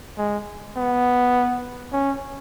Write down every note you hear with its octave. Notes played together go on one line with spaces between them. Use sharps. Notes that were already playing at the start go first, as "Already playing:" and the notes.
G#3
B3
C#4